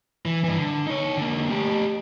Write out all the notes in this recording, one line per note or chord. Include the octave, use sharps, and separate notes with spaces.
E3
G2 E3
D3
D#4 C#5
D3 A#3
A3 G4